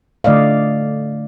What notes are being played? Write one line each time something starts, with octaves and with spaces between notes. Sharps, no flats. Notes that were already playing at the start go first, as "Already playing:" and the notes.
D3 A3 D5 D#5 F5